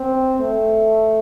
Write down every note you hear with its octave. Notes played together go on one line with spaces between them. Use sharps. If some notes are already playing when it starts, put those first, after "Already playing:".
Already playing: C4
A3